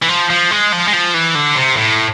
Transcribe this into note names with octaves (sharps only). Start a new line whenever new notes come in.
E3
F3
F3
G#3
F3
G#3
F3
E3
D3
C3
A2